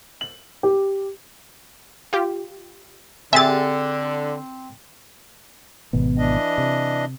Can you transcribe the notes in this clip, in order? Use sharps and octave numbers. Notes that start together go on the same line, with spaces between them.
F#7
G4
F4 G4
D3 C4 G4 G#4 E5 G#5 A6
G#1 B2 B3
E3 D4 D#5
C3